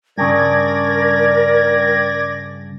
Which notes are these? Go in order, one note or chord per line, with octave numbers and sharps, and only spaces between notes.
G2 C#3 A#4 D5 G#6 A#6